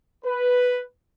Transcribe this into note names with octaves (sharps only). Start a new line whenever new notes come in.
B4